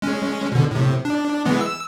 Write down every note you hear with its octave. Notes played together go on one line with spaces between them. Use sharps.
G#3 C#4
B2 D3
A2 C3
D4
E3 G#3 B3
E6